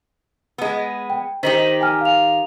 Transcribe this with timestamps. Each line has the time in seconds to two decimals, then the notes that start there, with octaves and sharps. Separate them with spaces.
0.58 G#3 B3
1.10 G5
1.43 D#3 D#4 G4 C5 B6 F#7
1.81 G5 G#5 F6
2.01 F5 F7